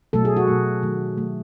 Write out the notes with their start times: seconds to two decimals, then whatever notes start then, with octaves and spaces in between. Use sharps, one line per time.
0.13 B2 F#3 A3 A4
0.25 G#4
0.37 F#4
0.48 B2 F#3 A3
0.83 D#3 F#3 A3
1.18 D#3 F#3 A3